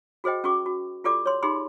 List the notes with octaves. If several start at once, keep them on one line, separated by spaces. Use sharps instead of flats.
F#4 G#4 C5 D#5 G5
C#4 F#4 G#4 C#6 D6
F#4
F4 G4 A4 D5 D6
C#5 C6
D#4 G4 G#4 B5 C6